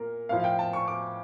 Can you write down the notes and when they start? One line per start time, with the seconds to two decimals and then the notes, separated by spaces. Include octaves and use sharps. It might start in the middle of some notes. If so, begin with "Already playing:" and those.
Already playing: A#2 A#4
0.29 A2 F3 F5
0.40 F5
0.44 G5
0.59 A5
0.73 C#6
0.88 D6